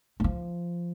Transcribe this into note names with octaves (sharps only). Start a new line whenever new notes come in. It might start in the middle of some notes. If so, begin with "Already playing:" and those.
G3
F3